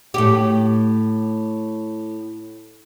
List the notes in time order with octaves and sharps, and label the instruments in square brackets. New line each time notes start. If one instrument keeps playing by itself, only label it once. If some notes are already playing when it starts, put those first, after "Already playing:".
[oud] A2 G4